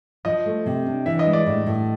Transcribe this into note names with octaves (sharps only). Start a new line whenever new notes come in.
F3 D#5
A3
C3
D4
E3 E5
D#5
G#3
D5
A2
A2